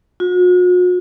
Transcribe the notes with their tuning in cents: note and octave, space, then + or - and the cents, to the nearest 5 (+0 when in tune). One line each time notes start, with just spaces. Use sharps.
F#4 -45